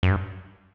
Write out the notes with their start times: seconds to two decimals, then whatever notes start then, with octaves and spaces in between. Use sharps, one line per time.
0.03 F#2
0.11 G2